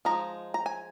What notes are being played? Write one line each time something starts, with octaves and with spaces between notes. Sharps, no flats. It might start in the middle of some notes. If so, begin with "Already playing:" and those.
F3 G#3 D#4 A#5
A#5
G#5